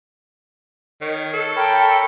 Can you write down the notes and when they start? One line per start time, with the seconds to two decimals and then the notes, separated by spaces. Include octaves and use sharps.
1.01 D#3 C#5
1.33 A4
1.56 A#4 C#5 G5 A5 B5